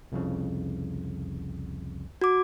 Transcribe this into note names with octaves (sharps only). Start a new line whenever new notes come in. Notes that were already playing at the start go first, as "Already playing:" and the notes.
C2 F2 C#3
F#4 D6